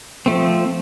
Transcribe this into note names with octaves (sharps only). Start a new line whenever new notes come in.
F3 A3 C4